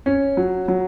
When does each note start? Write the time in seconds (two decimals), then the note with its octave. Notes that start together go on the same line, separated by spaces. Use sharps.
0.06 C#4
0.37 F#3
0.68 F#3